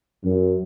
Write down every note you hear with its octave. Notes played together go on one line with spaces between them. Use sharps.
F#2